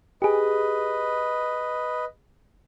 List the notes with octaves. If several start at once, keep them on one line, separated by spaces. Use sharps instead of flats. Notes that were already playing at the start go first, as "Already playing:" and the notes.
G4 G#4 B4 D#5